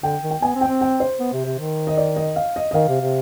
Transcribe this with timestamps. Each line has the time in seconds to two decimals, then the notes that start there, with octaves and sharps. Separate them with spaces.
0.03 D3 G5
0.22 D#3
0.30 G5
0.42 B3 G#5
0.55 C4
0.61 G5
0.68 C4
0.81 G5
1.00 C5
1.20 B3
1.33 C3
1.45 C3
1.59 D#3
1.87 D#5
1.97 D5
2.16 D#5
2.36 F5
2.56 D#5
2.71 D#5
2.74 D#3 F5
2.88 C3
3.00 C3